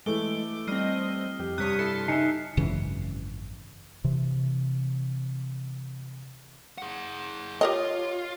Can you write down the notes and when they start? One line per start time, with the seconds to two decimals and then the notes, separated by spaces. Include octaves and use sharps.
0.06 E3 G#3 A3 A4 D6 G7
0.67 G3 C4 D#5 F6 C7
1.39 F2 G4
1.58 G2 C3 C#5 D#6 F#6 B6
1.79 E4 A4 A5 C6 C#7
2.08 C#3 D#4 E5 G#5 C7 C#7
2.57 G#1 F#2 C#3 E3
4.04 C3 E3
6.78 G#4 F#5
7.61 F4 G4 A#4 C#5 D#5